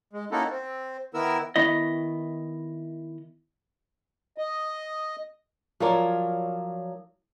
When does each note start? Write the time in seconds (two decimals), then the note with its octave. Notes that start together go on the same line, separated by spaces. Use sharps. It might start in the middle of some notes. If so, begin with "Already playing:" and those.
0.13 G#3
0.32 A#3 C#4 D#4 E4 F#4 A4
0.50 C4
1.14 D#3 B3 E4 A#4 E6
1.56 D#3 B3 E4 D#5
4.38 D#5
5.80 F3 F#3 F4 A#4 C#5 D5